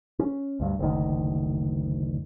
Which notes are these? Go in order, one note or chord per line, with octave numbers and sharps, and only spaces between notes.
C#4
D2 G2
F#1 D2 D#3